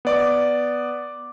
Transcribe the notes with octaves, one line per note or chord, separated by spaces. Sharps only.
B3 D5 D6